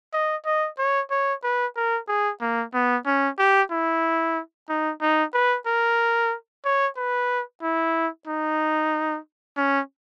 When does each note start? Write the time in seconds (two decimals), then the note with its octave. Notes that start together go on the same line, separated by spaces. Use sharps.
0.13 D#5
0.45 D#5
0.78 C#5
1.11 C#5
1.43 B4
1.76 A#4
2.08 G#4
2.41 A#3
2.74 B3
3.06 C#4
3.39 G4
3.71 E4
4.69 D#4
5.01 D#4
5.34 B4
5.66 A#4
6.65 C#5
6.97 B4
7.62 E4
8.27 D#4
9.57 C#4